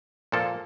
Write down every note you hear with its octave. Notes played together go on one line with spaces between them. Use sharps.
A#2 F3 A#3 A4